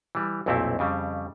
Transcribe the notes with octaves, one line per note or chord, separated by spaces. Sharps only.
E3 G3
B1 F2 A#2 A3 C4 E4
F2 C#3 G3